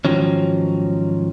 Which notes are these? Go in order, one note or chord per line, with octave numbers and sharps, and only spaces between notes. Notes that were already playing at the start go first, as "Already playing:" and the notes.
G#2 B2 D#3 F3 F#3 C#4